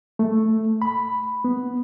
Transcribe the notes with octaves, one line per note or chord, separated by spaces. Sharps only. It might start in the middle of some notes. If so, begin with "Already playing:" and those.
A3
B5
B3